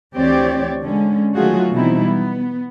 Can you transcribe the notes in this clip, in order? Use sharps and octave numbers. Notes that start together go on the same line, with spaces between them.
D2 E3 C4 G4 C#5 D5
D3 G#3 C#4
D#3 F#3 A3 F4 F#4 G#4
B2 E3 G3 C4 D#4 E4
B3